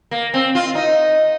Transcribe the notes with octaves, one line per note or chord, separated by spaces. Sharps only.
A#3
C4
F4
D#4